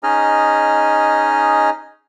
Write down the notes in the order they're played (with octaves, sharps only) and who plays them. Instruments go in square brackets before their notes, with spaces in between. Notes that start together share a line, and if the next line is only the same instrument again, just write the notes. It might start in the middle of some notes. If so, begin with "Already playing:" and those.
[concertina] C#4 D#4 G#4 D#5 F6